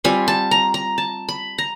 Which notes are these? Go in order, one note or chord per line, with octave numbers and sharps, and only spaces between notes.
G3 C4 F4 G#5
A5
A#5
A#5
A5
B5
A#5